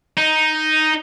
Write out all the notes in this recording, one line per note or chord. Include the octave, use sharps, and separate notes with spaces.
D#4